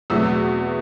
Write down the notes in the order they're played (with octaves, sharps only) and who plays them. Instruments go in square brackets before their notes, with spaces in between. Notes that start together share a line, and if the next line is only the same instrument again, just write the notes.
[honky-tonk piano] E2 B2 F#3 A3 E6